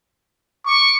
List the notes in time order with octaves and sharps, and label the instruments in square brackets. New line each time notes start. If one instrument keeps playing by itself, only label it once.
[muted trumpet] C#6 [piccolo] D6